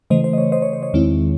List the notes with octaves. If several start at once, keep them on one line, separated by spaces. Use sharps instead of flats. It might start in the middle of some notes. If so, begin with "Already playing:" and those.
C#3 E3 A3 C5 D#5
C5
D#5
C#5
C5 D#5
C#5
C5
C#5
E2 D#3 G#3 C4 E4